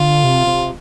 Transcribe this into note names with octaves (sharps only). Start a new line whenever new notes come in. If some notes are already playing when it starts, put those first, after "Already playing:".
Already playing: D3 F4
C3
C3